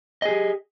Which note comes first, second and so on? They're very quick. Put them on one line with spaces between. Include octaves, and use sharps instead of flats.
D#5 G#4 G4